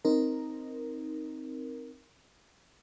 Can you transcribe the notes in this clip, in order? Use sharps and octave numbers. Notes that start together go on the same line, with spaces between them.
C4 D#4 A#4